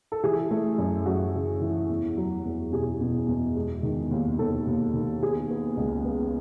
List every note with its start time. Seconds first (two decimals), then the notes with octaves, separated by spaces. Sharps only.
0.12 A4
0.24 E3 G#4
0.51 A3
0.78 F#2
1.06 F#2 F#4
1.34 C#3
1.61 E3
1.89 E2
2.17 F#3
2.45 E2
2.72 B2 G#4
3.01 B2
3.28 E2
3.56 G#3
3.83 D#3
4.11 D#2
4.39 D#2 A4
4.67 D#2
4.94 D#3
5.22 B3 G#4
5.50 B3
5.77 C#2
6.05 B3